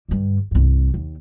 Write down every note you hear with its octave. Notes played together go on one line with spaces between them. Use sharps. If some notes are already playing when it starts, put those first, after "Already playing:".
G2 D3
C2 G2
D#2